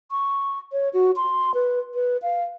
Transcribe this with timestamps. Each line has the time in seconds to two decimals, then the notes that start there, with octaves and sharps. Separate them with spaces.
0.11 C#6
0.72 C#5
0.93 F#4
1.16 C6
1.54 B4
1.94 B4
2.22 F5